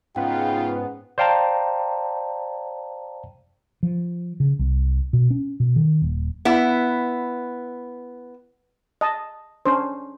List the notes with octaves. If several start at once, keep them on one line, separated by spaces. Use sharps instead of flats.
G#2 C#3 B3 C#4 F4 F#5 G5
C5 D5 F5 G5 A5 A#5
F3
C#3
C2
B2
C#4
B2
D#3
D#1
B3 E4
D#5 A5
C#4 D4 C5